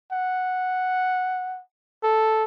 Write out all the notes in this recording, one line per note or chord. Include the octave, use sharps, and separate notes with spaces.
F#5
A4